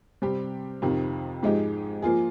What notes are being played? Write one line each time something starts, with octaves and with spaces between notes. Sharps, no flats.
C3 G3 C4 G4
F2 C3 D#3
G#2 F3 G#3 D#4 G4
F3 A#3 F4 G#4